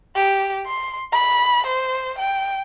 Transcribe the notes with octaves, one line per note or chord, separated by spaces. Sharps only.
G4
C6
B5
C5
G5